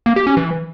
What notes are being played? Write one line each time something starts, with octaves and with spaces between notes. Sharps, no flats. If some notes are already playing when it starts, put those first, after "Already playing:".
A#3
G4
C#4
E3